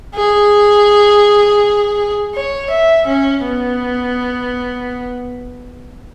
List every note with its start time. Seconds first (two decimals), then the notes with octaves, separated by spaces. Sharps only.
0.16 G#4
2.35 C#5
2.70 E5
3.07 C#4
3.44 B3